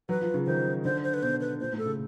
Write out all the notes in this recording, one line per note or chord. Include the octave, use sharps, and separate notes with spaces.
F#3 B4
F3
C#3
D#3 C5
D3 C5
C5
B4
B2 C5
B4
A#2 C5
A2
A4
C#3